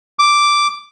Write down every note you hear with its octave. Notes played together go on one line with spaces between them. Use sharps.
D6